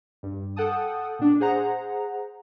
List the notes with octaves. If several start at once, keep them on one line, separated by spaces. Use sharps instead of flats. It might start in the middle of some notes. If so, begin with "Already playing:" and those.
G2
A4 F#5 G5 A5 D#6
A#2 D4
G#4 C5 F#5 A#5